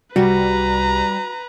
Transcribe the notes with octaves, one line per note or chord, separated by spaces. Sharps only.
C2 G3 F#4 B4 A#5